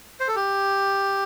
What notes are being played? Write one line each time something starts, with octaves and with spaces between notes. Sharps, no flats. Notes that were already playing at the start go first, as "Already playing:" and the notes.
C5
A4
G4